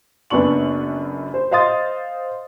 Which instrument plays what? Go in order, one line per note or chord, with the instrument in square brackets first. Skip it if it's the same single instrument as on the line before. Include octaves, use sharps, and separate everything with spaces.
[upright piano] F#1 F#2 B3 D4 C#6 F#7
C5
C5 D#5 F5 C6 D#6 A6